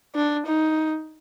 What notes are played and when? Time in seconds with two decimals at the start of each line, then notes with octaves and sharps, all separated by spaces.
0.15 D4
0.47 D#4